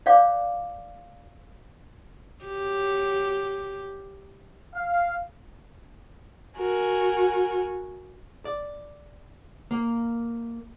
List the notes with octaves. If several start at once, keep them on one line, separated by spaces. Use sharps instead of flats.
C5 D5 F5 D6
F#3 G4
F5
F#4 A#4 G#5
D5
A#3